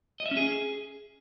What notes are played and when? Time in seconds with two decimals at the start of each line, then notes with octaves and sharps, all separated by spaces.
0.20 D#5
0.26 E5
0.31 C#4
0.37 G#4